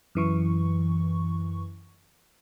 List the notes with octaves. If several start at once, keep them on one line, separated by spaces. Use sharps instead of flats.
F#2 E3 C#6